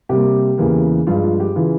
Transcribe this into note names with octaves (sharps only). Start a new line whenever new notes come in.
C3 G3 A#3 G4
E2 C#3 E3 A#3
G2 F3 G#3 F4
F4
G4
C#3 E3 F4